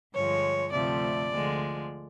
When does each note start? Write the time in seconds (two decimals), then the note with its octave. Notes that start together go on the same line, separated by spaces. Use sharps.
0.12 G2 D3 F3 G#3 C#5
0.72 D2 C3 F3 A3 D5
1.31 D2 D3 F3 G#3